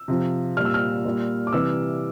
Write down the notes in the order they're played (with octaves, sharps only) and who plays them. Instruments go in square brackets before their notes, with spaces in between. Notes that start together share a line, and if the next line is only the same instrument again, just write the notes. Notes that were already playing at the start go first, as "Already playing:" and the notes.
Already playing: [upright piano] E6
C3 F3
A#2 G3 F6
E6
F6
A#2 G3
D6
C3 E3 G3 E6